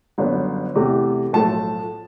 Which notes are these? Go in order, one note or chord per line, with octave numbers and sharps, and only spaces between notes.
G1 F#2 D3 F#3 B3
E2 C3 E3 A3
B1 A2 F3 A3 A5